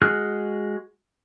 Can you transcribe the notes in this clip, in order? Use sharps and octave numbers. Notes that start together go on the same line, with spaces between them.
G#3 F#4 G#4 F6 F#6